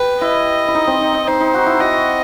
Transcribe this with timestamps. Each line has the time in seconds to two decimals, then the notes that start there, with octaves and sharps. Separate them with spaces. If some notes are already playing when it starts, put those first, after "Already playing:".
Already playing: G4 B4
0.21 E4 D#5
0.68 E4
0.75 D#4
0.87 C4
1.01 D#4
1.14 D#4
1.27 D#4 C5
1.41 D#4
1.54 F#4
1.66 E4
1.80 F#4 D#5